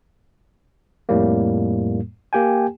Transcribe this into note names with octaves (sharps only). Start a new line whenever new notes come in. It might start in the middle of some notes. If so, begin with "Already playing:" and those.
F2 A2 G3 A#3
A#3 G4 G5 G#5